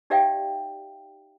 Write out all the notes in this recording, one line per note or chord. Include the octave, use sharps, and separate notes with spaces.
D#4 G4 D5 E5 F5 G5